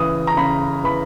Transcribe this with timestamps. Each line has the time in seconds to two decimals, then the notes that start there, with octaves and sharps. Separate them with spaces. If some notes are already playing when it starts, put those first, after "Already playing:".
Already playing: C#3 E3 D#6
0.27 A#5
0.37 C#3 B5
0.84 E3 B5